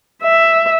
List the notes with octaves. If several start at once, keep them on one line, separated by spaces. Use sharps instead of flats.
E5